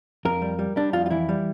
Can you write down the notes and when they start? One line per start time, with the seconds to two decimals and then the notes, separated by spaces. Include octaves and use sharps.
0.25 F2 A#4
0.42 G3
0.59 G3
0.76 G3 D4
0.93 F2 F4
1.06 F4
1.11 E3 E4
1.29 G3